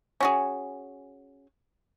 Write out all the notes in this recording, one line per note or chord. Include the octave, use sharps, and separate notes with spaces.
C#4 F#4 G#4